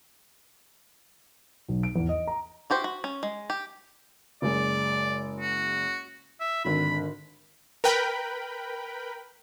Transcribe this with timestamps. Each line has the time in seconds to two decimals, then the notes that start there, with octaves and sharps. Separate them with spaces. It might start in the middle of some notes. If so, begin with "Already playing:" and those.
1.68 B1
1.83 D7
1.96 E2
2.09 D#5
2.27 A#5
2.70 E4 F#4 G4 C5
2.84 F#4
3.04 C#4
3.23 G#3
3.50 G4
4.42 F#1 G#3 D5
5.40 F#4
6.40 E5
6.65 G#1 D3 B5
7.84 A#4 B4 G5 B5